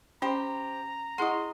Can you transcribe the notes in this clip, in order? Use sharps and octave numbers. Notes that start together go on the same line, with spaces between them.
C#4 G4 C5 G5 A#5
E4 G#4 D#5 F#5 C6